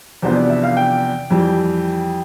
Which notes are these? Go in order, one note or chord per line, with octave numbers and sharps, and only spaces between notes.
E2 C3 F3 B3 D4 C5
D5
E5
F5
G5
F2 E3 G3